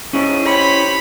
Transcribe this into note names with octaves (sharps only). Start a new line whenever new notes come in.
G#2 C#4 E4
G4 C5 C#5 B5